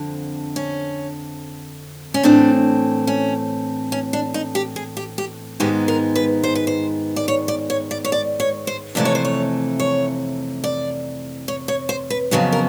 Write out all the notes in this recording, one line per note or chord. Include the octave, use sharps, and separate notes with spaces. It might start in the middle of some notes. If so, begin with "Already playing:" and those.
Already playing: F2 D3 C4
C#4
C#4
A2 E3 A3 C4 D4
C#4
C#4
D4
D#4
G4
G#4
G4
G4
G#2 D#3 G#3 B3 G4
A#4
B4
C5
B4
C5
D5
C#5
D5
C#5
D5
C#5
D5
C#5
C5
F2 C3 E3 A3 D5
C#5
C5
C#5
C#5
D5
C#5
C#5
C5
B4
F2 C#3 F#3 B3 A#4
A#4